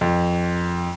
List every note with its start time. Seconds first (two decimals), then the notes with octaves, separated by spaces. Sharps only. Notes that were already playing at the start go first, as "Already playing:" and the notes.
0.01 F2